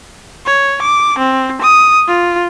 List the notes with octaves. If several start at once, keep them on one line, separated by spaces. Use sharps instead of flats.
C#5
D6
C4
D#6
F4